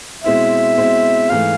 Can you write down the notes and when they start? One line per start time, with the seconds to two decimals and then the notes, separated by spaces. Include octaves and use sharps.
0.24 B2 G#3 C4 E4 E5
0.78 B2 G#3 C4 E4
1.30 G#2 E3 A3 F5